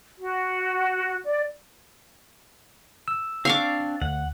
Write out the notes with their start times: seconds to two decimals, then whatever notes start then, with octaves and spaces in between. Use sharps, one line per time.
0.19 F#4
1.26 D5
3.08 E6
3.45 C4 D4 F5 C#6 D6
4.02 D2 F#5